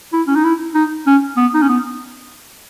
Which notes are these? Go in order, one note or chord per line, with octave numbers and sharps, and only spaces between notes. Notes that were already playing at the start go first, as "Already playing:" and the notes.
E4
C#4
D#4
E4
D#4
C#4
B3
D#4
C#4
B3